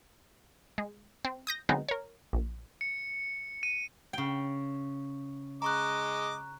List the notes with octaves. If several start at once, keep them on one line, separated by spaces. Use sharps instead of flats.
G#3
C4
D#6 G6 A#6
D3 F#3 G#3 B3 C4 D#4
A#4 C#5
A#1
C#7
D#7
C#3 G5
G#3 D#5 A#5 C#6 D6 F#6